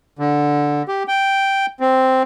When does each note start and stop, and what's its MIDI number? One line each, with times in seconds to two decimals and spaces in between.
0.19 0.83 50
0.88 1.03 67
1.08 1.66 79
1.80 2.23 60